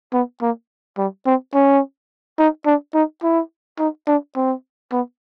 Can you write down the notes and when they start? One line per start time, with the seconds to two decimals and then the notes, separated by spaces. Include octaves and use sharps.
0.13 B3
0.42 A#3
0.98 G3
1.26 C4
1.54 C#4
2.39 D#4
2.66 D4
2.94 D#4
3.23 E4
3.79 D#4
4.07 D4
4.36 C4
4.92 B3